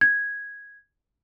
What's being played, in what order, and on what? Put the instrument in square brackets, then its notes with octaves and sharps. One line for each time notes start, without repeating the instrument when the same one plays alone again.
[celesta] G#6